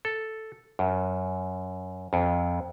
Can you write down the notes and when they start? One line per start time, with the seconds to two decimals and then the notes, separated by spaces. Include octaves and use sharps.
0.05 A4
0.79 F#2
2.13 F2